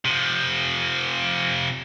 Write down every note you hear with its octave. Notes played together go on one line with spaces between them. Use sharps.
C3 F3